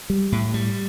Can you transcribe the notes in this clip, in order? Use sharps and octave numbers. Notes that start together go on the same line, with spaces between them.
G3
A2
G3